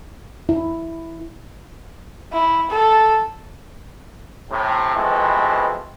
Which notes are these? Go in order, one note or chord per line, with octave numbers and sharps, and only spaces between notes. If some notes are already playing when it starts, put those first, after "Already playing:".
E4
E4
A4
A2 C3
B2 E3 F3 G#3 A3 C4